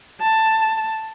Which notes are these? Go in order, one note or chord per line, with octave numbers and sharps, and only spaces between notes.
A5